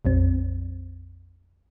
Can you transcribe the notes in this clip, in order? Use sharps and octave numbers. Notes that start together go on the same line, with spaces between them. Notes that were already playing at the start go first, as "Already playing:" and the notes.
A#1 F2 C4